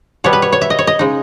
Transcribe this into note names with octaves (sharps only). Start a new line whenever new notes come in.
B2 G3 B3 C#5
B4
C#5
C#5
E5
D#5
C#5
D#5
C#3 G#3 D#4